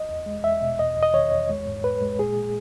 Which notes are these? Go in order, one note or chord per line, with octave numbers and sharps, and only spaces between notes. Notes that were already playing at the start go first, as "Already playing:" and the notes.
Already playing: D#5
E2
G#3
E2 E5
B2
E2 D#5
E2
D#5
D#3 C#5
E2
G#3
G#2
G#2 B4
G#3
A#2 G#4
A#2